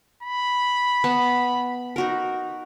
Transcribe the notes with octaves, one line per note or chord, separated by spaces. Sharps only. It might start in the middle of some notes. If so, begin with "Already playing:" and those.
B5
B3 A5
D#4 F#4 A#4